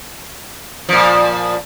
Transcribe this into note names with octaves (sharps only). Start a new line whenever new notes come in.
A#2 F3